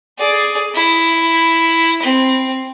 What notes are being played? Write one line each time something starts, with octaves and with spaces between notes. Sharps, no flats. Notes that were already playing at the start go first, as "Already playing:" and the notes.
G#4 D5
E4
C4